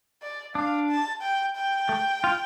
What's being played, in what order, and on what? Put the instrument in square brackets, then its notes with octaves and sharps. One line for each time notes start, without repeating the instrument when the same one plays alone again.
[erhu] D5
[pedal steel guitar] D4 [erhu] F5
[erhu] A5
G5
G5
[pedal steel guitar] A3
F4